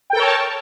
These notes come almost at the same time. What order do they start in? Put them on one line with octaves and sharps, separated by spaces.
G5 A4 A#4 C#5 A5